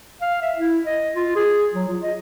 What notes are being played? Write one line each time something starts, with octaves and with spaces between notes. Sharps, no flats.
F5
E5
E4
D#5
F4
G#4
F#3
F4
D#5